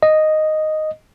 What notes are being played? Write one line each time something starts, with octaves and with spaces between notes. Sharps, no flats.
D#5